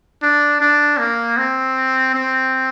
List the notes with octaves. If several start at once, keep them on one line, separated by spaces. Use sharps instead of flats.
D4
D4
A#3
C4
C4